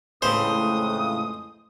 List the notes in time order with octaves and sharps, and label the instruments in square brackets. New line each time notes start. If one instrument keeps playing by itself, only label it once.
[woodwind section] F2 G#3 A3 [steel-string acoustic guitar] A2 C#3 E3 [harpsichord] C5 [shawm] D#6